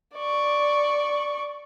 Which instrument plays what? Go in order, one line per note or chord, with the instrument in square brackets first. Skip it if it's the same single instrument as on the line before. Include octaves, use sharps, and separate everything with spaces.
[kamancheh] D5 C#6